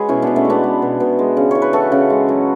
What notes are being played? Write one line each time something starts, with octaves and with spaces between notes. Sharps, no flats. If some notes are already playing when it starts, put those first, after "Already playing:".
Already playing: G#3 F#4 G#4 B4 C#5
B2 C#4 E4
B2 B3 D4
A3 C#4
G#3 B3 D4
G#3
B2
B2
G#3
C#3
E3 C#5
B4
E3 F#4 A4
C#3
G#3
F#3